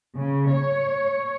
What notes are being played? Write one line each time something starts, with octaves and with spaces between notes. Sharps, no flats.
C#3
C#5